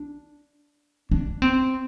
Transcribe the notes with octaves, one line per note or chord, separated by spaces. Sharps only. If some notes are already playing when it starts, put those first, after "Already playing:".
Already playing: D4
D4
C4